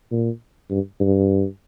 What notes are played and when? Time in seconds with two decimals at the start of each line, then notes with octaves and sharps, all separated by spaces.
0.12 A#2
0.71 G2
1.00 G2